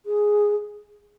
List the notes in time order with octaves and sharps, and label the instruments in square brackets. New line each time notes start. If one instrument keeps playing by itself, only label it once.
[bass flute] G#4